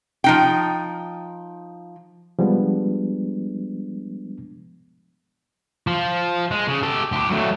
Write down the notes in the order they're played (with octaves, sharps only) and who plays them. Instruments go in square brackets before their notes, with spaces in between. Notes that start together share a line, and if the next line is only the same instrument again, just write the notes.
[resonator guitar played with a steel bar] F3 D#4 G5
[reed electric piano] F3 G3 G#3 B3 D4
[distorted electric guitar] F3
G#3
C#3
G4 A4
D2 G4
F#3 A3